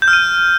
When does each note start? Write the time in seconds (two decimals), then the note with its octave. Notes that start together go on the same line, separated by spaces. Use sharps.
0.02 G6
0.08 F6
0.13 D#7